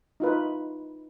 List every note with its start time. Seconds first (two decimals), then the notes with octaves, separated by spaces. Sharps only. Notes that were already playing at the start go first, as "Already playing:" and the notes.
0.20 D#4 F4 B4